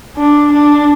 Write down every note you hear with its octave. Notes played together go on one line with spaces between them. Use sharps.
D4
D4